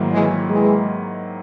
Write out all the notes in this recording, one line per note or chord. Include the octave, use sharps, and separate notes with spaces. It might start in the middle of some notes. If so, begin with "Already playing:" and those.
Already playing: G#2 D#3 F#3 A#3 E4
E3 G#3
E3 G#3